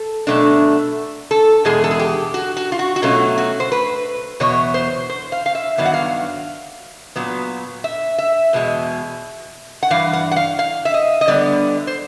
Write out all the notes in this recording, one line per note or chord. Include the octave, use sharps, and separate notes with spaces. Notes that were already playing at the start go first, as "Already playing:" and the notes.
Already playing: A4
B2 F#3 A3 D4
A4
E2 B2 G#3 G#4
A4
G#4
G4
F#4
F#4
F4
F#4
F#4
B2 F#3 A3 C#4 F4
F#4
C5
B4
E2 B2 F#3 B3 C#5
C5
C5
F5
F5
E5
G2 D#3 F#3 B3 D4 F5
F#5
F5
A#2 F#3 B3
E5
E5
E2 B2 G#3
F#5
G2 E3 F5
F#5
F#5
F5
F5
E5
D#5
D#5
D3 G3 B3 D5
C5